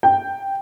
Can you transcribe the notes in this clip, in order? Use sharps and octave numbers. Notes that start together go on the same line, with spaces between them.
G5